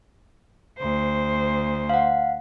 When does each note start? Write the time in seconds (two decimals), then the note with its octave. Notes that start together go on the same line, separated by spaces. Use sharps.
0.79 D2 C5
1.89 F5 F#5